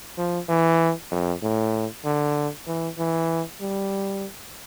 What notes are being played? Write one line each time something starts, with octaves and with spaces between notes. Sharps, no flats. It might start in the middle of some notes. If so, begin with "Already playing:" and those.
F3
E3
F2
A2
D3
E3
E3
G3